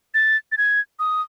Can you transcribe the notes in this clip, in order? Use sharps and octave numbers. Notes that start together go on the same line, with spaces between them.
A6
A6
G#6
D#6